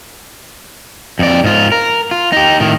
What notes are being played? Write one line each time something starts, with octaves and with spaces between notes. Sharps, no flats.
F2 D5
G#2 F4
A#4
F4
D#4 G4
A2 D#3